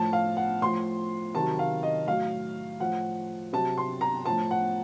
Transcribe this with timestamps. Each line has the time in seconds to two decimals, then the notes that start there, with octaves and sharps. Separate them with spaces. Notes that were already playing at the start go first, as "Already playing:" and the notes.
Already playing: A2 F3 A5
0.13 F5
0.37 F#5
0.62 A2 F3 C6
1.35 C3 D#3 F#3 A5
1.59 F5
1.83 D#5
2.07 A2 F#3 F5
2.80 A2 F3 F#5
3.53 C3 F#3 A5
3.78 C6
4.01 A#5
4.26 A2 F3 A5
4.51 F#5